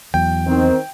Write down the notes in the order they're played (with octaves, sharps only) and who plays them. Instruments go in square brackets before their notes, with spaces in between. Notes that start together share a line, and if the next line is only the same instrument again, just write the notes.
[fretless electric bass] E2 F#3 [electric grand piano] G5
[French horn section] D#3 C4